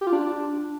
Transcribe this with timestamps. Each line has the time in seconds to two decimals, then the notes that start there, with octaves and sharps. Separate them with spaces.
0.01 G4
0.07 F4
0.13 D4